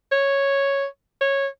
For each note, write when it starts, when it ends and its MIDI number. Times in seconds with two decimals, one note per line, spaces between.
0.12 0.86 73
1.21 1.47 73